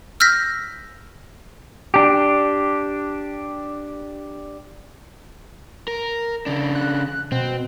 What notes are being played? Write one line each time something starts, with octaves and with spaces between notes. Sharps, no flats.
E6 F6 G6 A#6 B6
D4 G4
A#4
C#3 D4
F#6
B2 C4